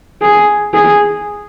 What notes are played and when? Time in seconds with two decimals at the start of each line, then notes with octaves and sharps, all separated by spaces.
0.22 G#4
0.74 G#4